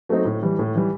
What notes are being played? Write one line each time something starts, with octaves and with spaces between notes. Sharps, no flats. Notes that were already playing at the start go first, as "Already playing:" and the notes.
F#3 A3 C4 D#4
A2
E3 G3
A2
E3 G3